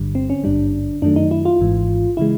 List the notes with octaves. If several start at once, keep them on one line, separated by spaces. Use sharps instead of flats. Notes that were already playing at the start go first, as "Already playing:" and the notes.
Already playing: G1 G2 D3 G3
C4
C#4
G#1 G2 D3 G3 D4
F#2 D#3 F#3 A3 D4
D#4
E4
F4
G#1 G#2 E3
C#3 E3 G#3 E4